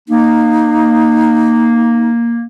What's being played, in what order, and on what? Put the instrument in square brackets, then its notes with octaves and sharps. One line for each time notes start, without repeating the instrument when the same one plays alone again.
[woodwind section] A#3 [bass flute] D#4